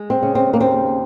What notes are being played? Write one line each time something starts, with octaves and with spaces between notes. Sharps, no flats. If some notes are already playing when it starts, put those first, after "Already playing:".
Already playing: G#3
C4
C#3
C4
A#3
D#2 C4